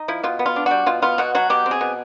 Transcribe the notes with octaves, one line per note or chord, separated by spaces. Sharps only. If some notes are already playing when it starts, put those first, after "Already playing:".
Already playing: D#4
F3 E4
B2 F4
B3
F4
D4
G3 F#4
B2 F4
B3 F4
B2 F#4
F#3 F#4
B2 G4
C4
G#4
B2